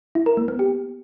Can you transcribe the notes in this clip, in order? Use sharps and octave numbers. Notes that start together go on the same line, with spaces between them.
E4
A#4
A#3
B3
G4